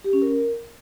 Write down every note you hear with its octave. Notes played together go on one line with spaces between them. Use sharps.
G4
C#4
A#4